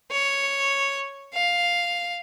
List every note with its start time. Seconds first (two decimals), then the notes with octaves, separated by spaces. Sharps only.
0.11 C#5
1.34 F5